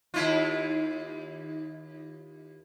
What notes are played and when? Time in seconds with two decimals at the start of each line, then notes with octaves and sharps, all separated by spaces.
0.14 D#2 E4 F4